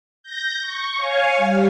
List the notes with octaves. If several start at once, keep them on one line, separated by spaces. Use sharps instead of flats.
G6 A#6
C#6
C#5 F5 G#5
G3